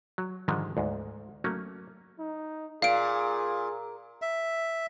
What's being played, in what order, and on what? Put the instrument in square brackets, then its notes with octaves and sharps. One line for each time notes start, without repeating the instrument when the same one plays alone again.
[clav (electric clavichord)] F#3
G#2 D3 D#3 F3 G3 G#3
D2 G#2
F#3 A3 A#3 C#4
[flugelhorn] D#4
[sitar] A#2 [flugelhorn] G#4 [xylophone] F5 D7
[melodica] E5